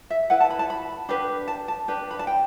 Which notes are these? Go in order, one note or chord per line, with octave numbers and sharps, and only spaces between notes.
E5
E4 B4 F#5
A5
B5
A5
B5
D4 G4 B4
A5
A5
D4 G4 B4
B5
A5
G5